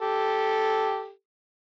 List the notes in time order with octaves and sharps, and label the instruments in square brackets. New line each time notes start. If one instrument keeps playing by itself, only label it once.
[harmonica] G4 A4